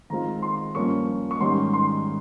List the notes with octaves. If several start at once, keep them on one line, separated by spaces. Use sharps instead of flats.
D#3 G#3 C4 F4 A#5
C6
G2 F3 A#3 C#4 C#6
C#6
G#2 D#3 G3 C#4 C6
C6